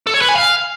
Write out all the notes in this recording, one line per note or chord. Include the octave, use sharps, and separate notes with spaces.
A4
C#5
B4
G#5
F5